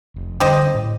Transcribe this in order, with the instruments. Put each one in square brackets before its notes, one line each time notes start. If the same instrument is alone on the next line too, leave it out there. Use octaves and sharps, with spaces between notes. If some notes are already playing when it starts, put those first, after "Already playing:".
[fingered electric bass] F1
[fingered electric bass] D3 G3 C#4 [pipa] G4 C5 D#5
[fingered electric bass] A2